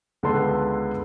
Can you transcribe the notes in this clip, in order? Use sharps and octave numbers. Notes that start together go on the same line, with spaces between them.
C#2 D3 B3 A4 A5 C6